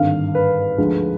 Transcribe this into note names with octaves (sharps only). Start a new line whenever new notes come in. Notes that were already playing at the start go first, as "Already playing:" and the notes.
Already playing: G#1 G2 D3 F5
B4
D2 D3 F3 G#3